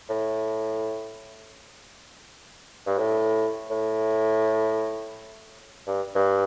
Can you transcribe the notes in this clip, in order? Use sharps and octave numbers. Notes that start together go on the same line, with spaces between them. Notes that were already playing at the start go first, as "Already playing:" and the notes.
A2
G2
A2
A2
G2
G2